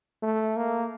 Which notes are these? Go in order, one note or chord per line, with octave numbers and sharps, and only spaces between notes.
A3
A#3